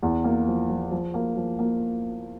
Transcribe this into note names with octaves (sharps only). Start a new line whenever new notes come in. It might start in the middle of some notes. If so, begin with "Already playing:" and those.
E2
A#3
F3
F3
F3
A#3
F3
A#3